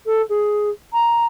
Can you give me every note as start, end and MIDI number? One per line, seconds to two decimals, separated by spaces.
0.05 0.21 69
0.29 0.69 68
0.93 1.25 82